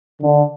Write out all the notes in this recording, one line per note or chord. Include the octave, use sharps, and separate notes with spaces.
D3